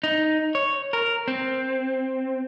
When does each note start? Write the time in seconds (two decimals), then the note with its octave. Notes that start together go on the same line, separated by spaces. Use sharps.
0.04 D#4
0.55 C#5
0.93 A#4
1.28 C4